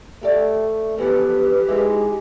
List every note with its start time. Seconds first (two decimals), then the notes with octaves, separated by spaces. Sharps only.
0.23 A3 G4 D5
0.98 E3 F3 B3 G4 A4 B4
1.68 G#3 C4 D#4 E4